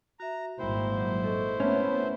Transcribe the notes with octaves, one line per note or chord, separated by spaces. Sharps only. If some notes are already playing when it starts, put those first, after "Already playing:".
F#4 E5 A#5
G#1 A#2 G3 A#3 E4 C5 B5
F#3
A4 D#5 C#6
A3 B3 C#4 E5